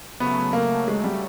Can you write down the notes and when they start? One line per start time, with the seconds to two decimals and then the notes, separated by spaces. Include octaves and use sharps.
0.20 C#3 F#3 A3 B3
0.53 A#3
0.88 G#3
1.04 G3